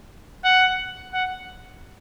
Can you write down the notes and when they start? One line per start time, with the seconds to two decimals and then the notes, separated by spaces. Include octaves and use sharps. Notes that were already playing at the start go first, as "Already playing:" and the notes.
0.44 F#5
1.14 F#5